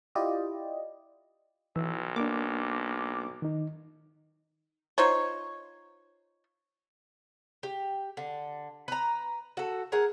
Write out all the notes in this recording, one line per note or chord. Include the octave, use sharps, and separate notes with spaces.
E4 F4 G4 D5 D#5
B1 E3 E6
A#3 D4 D6
D#3 D#4
D#4 F4 C5 C#5
G4
D3
B4 A#5
F#4 A4
G#4 A#4 F#5